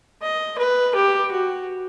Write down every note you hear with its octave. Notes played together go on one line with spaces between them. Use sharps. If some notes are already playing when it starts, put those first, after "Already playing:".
D#5
B4
G4
F#4